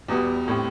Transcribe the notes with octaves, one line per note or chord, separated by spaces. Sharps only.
E2 B2 G3 B3
A2 G3 C4